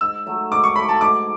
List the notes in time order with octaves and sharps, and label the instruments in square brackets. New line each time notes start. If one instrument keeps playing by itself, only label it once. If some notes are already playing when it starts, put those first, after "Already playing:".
[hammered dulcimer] G#2 [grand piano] E6
[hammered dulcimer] F#3 A3
[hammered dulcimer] G#2 [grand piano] D6
[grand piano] C#6
[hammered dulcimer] F#3 A3 [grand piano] B5
[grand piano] A5
[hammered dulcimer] G#2 [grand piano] D6